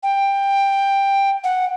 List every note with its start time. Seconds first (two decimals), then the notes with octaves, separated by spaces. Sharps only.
0.03 G5
1.44 F#5